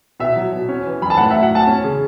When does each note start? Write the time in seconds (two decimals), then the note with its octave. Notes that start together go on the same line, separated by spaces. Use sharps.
0.20 B2 E5
0.36 F#3
0.52 B2
0.69 C#4
0.86 E3
1.02 F#2 B5
1.10 A5
1.18 A2 F#5
1.30 E5
1.35 F#3
1.43 F#5
1.51 A2 A5
1.67 C#4
1.84 C#3